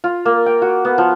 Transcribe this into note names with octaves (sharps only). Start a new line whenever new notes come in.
F4
A#3
G5
F#4
B3
F3